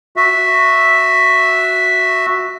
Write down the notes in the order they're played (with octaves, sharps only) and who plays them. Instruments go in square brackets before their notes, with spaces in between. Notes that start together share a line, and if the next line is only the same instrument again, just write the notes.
[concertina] F#4 E5